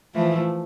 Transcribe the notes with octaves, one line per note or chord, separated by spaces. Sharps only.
E3 F3 A3